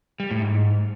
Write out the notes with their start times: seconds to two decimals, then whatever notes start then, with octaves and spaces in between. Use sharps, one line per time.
0.20 G3
0.31 A2
0.42 G#2